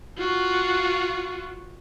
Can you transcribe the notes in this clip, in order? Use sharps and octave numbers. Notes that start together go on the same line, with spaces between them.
F4 F#4